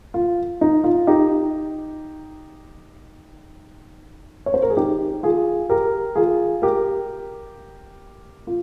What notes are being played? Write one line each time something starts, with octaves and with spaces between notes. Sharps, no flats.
F4
D#4
F4
D#4 G4
C#5
C5
A#4
G#4
D#4 G4
F4 G#4
G4 A#4
F4 G#4
G4 A#4
F4